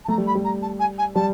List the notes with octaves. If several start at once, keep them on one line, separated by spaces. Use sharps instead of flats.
A5
A3 A#5
G3
B5
G3
A#5
A5
G#5
G#5
G3 A5